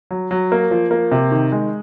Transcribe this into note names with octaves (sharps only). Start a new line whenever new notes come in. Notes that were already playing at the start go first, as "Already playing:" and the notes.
F#3
F#3
A#3
F3
A#3
C3
D#3
G#3